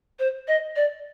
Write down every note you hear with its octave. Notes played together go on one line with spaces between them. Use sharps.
C5
D#5
D5